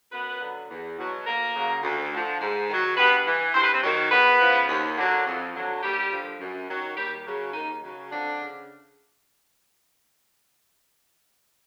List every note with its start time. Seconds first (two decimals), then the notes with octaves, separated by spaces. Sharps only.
0.11 F#2 B3 B4
0.41 D3 F#3
0.69 E2
0.97 B2 F#3
1.26 D2 A#3 A#4
1.54 C#3 F#3
1.83 D2
2.11 D3 F3
2.40 G#2
2.68 D#3 F#3
2.97 G2 B3 B4
3.26 E3
3.54 G2 C5
3.63 B4
3.73 C4 C5
3.83 D#3 F#3
4.11 E2 B3 B4
4.40 C#3 F3
4.68 D#2
4.96 D3 F#3
5.25 F2
5.53 D3 F#3
5.82 D#2 G3 G4
6.11 D3 F3
6.39 F#2
6.68 D#3 F#3
6.96 D#2 G3 G4
7.26 C#3 F#3
7.53 D#2 D#3 D#4
7.83 C#3 F#3
8.10 F2 D3 D4
8.39 C#3